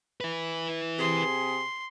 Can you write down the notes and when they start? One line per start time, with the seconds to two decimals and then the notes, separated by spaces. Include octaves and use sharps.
0.21 E4 B4
0.98 C3 G#4 C6